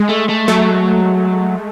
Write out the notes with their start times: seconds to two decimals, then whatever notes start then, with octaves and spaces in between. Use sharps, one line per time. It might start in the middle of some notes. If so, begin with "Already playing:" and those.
Already playing: G#3
0.09 A3
0.29 A3
0.48 F#3 A3